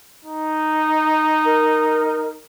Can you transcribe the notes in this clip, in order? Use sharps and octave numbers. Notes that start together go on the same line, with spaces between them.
D#4
A#4